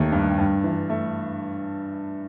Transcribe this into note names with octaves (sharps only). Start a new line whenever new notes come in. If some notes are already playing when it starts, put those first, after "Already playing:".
Already playing: D#2 D#3 A3
G2
G2
E3
A3